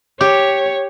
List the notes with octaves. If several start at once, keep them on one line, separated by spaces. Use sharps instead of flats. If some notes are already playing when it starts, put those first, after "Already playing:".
G4 C#5